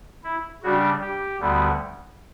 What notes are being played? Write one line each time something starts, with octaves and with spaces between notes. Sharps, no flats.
E4
C#3 G3 D4 F#4
G4
D2 D3 G3 B3